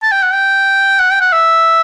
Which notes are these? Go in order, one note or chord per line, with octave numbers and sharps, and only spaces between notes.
A5
G5
F#5
G5
F#5
G5
F#5
E5